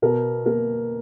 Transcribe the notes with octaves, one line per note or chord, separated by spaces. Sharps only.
B2 A#4
A#3 A#4